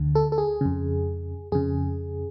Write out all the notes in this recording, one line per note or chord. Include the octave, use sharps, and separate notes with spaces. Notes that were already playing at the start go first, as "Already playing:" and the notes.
Already playing: D2 D3
A4
A4
G#4
F2 C#3
F2 C#3 G#4